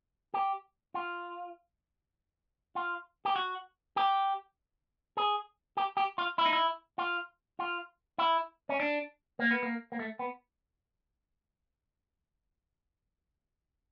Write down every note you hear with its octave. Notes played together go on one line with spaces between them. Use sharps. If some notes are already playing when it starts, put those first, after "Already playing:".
G4
F4
F4
G4
F#4
G4
G#4
G4
G4
F4
E4
D#4
E4
F4
F4
E4
C#4
D4
A#3
B3
A#3
A#3
A3
B3